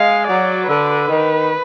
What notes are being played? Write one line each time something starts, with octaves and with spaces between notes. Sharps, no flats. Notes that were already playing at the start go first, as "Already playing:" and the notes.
Already playing: G#3 F5
F#3 D5
D3 B4
D#3